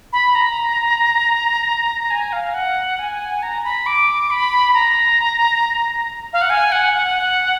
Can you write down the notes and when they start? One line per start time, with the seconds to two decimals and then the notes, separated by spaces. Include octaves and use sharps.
0.13 B5
0.35 A#5
2.11 G#5
2.32 F5
2.54 F#5
2.99 G#5
3.43 A#5
3.64 B5
3.86 D6
4.30 B5
4.74 A#5
6.33 F5
6.41 F#5
6.50 G#5
6.72 F#5
6.95 F#5